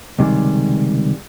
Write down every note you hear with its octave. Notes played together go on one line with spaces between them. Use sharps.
C#2 C3 D#3 G3 G#3